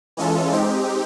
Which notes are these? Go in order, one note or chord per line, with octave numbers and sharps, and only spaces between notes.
E3 G#3 C#4 F4 A4
G#3 C4 D#4 G4